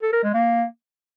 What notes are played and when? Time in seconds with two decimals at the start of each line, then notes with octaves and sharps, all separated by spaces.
0.02 A4
0.13 A#4
0.24 G#3
0.34 A#3